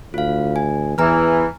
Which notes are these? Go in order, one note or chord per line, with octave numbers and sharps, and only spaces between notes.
D2 F4 F5
G#5
E2 E3 G#5 A#5 F6